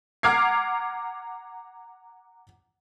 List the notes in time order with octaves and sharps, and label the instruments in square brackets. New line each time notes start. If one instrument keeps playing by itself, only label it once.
[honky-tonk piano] F#5 A#5 D6 F6 G#6 C7